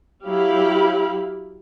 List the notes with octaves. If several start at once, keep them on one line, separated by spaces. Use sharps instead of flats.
F#3 E4 G4 F5 B5